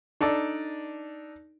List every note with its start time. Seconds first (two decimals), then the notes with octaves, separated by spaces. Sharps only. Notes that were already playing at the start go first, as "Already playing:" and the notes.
0.21 D4 D#4 A4 D5